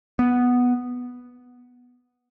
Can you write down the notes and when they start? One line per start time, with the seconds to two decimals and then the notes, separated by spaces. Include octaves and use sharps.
0.19 B3